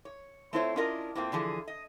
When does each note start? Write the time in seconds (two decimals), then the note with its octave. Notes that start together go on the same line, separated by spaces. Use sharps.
0.05 C#5
0.53 A3 C4 E4 F4 C5 C#5
0.76 C#4 D4 E4 F4 A#4 D#5
1.15 A2 A#3 C4 F4
1.32 D3 E3 F3 G#4
1.68 D#5